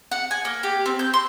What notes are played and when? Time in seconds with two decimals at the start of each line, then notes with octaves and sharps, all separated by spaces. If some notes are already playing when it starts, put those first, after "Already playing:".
0.11 F#5
0.31 G#5
0.45 A#3
0.63 G4
0.86 C4
0.99 G6
1.14 C6